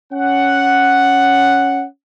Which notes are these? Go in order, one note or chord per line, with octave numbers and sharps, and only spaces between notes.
C#4 F#5